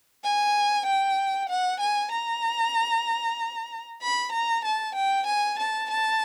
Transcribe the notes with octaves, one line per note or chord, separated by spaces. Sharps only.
G#5
G5
F#5
G#5
A#5
B5
A#5
A5
G5
G#5
A5
A5